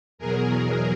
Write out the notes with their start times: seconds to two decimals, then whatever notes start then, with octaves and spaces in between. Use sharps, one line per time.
0.18 E2 B2 F#3 G#4 A#4